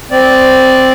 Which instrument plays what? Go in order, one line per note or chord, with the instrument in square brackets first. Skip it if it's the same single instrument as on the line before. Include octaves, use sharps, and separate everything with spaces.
[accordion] C4 D5